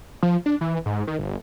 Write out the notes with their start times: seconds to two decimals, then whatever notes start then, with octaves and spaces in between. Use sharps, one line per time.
0.23 F3
0.46 D4
0.61 E3
0.86 G#2
1.07 D#3
1.19 G1